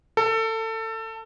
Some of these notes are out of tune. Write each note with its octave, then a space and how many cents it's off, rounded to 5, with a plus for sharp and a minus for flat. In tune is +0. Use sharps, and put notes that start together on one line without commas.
A4 +25